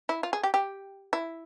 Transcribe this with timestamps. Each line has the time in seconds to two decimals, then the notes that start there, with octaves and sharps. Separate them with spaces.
0.09 E4
0.23 F4
0.33 G#4
0.43 G4
0.54 G4
1.13 E4